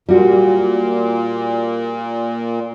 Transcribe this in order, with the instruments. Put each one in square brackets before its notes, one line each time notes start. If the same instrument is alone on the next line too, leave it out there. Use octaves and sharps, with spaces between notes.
[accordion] A#2 [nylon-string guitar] G3 F#4